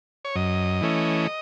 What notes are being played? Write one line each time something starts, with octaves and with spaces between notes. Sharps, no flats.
C#5
F#2 D#5
E3 A3 C#4